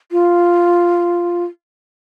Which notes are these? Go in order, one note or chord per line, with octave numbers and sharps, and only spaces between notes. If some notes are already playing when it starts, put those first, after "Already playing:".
F4